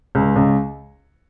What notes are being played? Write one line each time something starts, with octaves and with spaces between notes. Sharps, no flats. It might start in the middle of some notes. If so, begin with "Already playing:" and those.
C#2
C#2